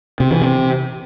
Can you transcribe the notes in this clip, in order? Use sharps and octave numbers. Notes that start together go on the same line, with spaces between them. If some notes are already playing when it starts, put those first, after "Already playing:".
C3
E3
C3